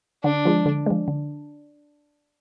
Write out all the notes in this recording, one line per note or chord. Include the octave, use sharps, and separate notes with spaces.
D3 D4
F3 G#3
D3
F3 G#3
D3